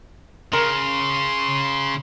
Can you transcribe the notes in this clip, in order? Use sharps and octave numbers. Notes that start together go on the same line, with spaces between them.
C#3 A#4 C6